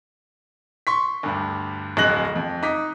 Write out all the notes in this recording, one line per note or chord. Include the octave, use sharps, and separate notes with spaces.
C6 C#6 B6
D2 G2
D1 F2 G#3 F#6 A#6 F#7
F2
D#4 D6 B6